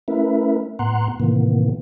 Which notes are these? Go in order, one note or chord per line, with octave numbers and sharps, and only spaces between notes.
A3 C#4 E4 A#4 B4 E5
A2 B3 F#5 A#5 C6 F#6
A2 C3 D#3 E3 A#3 B3